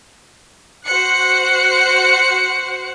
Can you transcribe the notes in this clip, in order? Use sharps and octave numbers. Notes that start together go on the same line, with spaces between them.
F#4 C5 F#6 C#7